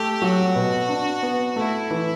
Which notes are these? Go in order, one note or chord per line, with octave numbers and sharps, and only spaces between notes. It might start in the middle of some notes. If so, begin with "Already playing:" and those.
Already playing: A3 G4
F#3 F#4
B2
D4
B3
A3 E4
E3